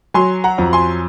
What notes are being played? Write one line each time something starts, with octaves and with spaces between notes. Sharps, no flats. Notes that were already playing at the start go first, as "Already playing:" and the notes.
F#3 G#5 C6
F#5 A#5
F2
G#5 C6